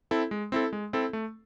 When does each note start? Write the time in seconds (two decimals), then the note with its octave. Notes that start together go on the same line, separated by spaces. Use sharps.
0.11 C4 E4 A4
0.31 G#3
0.52 C4 E4 A4
0.73 G#3
0.93 C4 E4 A4
1.13 A3